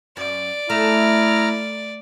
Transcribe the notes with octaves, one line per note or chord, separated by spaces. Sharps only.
F#2 D5
A3 E4 A#5 F6